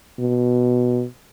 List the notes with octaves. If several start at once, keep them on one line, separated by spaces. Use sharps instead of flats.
B2